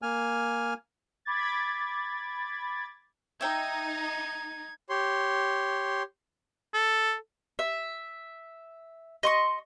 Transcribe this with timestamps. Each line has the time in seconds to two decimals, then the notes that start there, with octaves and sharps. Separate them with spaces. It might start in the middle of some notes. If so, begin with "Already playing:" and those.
0.02 A#3 G#5 F6
1.25 B5 D6 G#6 A6
3.41 D#4 E5 G5 G#6
4.89 G4 C#5 C6
6.74 A4
7.59 E5
9.23 D#5 C6 C#6